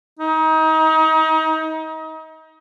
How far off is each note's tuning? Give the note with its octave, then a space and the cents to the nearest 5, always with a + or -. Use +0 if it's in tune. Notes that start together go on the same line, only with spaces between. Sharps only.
D#4 +30